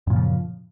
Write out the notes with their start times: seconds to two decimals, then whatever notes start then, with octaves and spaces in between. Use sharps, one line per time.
0.07 F#2
0.10 A#2
0.13 C#3
0.16 F3